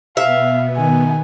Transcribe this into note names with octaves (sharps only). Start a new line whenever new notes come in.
B2 B3 E5 F5
D#3 G#5